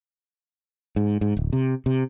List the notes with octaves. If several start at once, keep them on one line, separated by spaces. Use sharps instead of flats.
G#2
G#2
D1
C3
C3